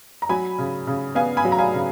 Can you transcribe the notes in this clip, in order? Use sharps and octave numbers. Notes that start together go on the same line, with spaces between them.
A#5
F#3 G#5 B5
C#3
C#3
B3 F5 G#5
G#5 B5
F#3
A#5
F5 G#5
C#3